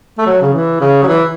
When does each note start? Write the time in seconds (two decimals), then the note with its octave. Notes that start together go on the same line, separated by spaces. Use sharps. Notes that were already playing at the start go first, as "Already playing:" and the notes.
0.18 A3
0.26 F#3
0.41 C#3
0.53 E3
0.80 C#3
1.02 F#3
1.08 E3